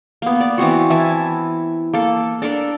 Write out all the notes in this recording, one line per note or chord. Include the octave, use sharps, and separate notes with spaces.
A#3 B3
D5
E3 B3 C4 F#4
E3 E4 G#5 A5
A#3 A4
D4 A4 A#4 D5